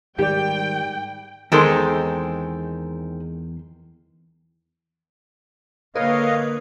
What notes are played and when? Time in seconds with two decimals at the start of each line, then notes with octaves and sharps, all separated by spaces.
0.18 G#2 D#3 G3 G4 D5 G5
1.52 E2 D#3 G#3 C4 A4 A#4 C6
5.96 D3 A#3 A#4 B4 C#5 D#5 F5